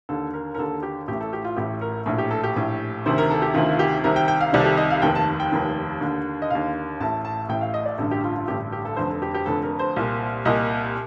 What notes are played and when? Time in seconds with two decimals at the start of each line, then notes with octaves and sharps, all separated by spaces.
0.09 D#2 D3 A4
0.34 A#4
0.55 A#4
0.58 D#2 D3 A4
0.83 G4
1.08 A1 G4
1.12 A2
1.21 A4
1.33 G4
1.44 F4
1.57 A1 A2 G4
1.81 A#4
2.06 A#1 A2
2.18 G4
2.31 A4
2.44 G4
2.56 A#1 A2
3.06 D2 C3 D#3 C5
3.18 A#4
3.30 A4
3.42 G4
3.54 D2 C3 D#3 F4
3.72 F4
3.79 G4
4.04 C2 C3 D#3 A#4
4.16 G5
4.28 G5
4.41 F5
4.53 C2 C3 D#3 D5
4.60 A4
4.65 G4
4.77 D#5
4.90 F5
5.02 F1 D#2 D#3 G5
5.15 A5
5.40 G5
5.52 F1 D#2 D#3
6.01 D#2 D3
6.42 D#5
6.50 D#2 D3 F5
7.00 A1 A2 A5
7.25 A5
7.49 A1 A2 G5
7.61 F5
7.74 D#5
7.86 D5
7.98 A1 G2 D3 A4
8.11 G4
8.24 F4
8.36 F4
8.47 A1 G2 D3 G4
8.72 G4
8.85 A4
8.97 F1 F2 D3 C5
9.10 A4
9.22 G4
9.34 G4
9.46 F1 F2 D3 A4
9.63 A#4
9.79 C5
9.96 C2 A#2
10.45 C2 A#2 D#5